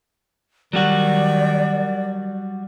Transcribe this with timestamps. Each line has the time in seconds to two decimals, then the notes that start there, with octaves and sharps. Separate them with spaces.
0.73 D#3 F#3 G3 F#4 D5